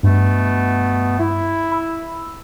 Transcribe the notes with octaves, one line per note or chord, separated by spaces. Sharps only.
G2 B2 A3 B3
E4
B5 E6